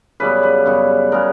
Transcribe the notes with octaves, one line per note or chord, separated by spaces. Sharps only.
F#2 C#3 G3 B3 B4
B4
F#2 C#3 G3 B3
C#3 G3 B3 A#4